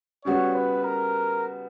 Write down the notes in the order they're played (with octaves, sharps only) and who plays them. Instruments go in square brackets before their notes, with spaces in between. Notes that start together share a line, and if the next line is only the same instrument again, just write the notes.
[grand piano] C#3 G3 B3 F#4 [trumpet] C#5
[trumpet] B4
A#4